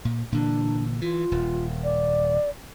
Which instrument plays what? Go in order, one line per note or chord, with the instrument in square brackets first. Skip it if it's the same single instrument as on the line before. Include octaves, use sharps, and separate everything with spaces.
[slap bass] A#2
[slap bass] A#2 D3 E3 [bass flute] D4
[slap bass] E3 [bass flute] F4
[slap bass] D#1
[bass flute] D5